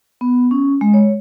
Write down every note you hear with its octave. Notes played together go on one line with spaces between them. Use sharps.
B3
C#4
G#3
C#5